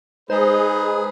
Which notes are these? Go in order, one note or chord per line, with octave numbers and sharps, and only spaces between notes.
G#3 D#4 G#4 B4 C5